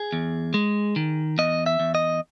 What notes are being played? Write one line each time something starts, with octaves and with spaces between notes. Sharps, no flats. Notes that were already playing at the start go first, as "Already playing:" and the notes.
Already playing: G#4
E2
G#3
D#3
E2 D#5
E5
E2
D#5